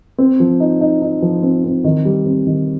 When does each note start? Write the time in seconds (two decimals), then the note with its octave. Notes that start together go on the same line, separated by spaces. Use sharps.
0.18 C4
0.40 F3
0.60 D#4
0.81 D#4
1.02 D#4
1.22 F3
1.43 C4
1.64 C4
1.84 D#3
2.05 G3
2.26 C4
2.47 D#3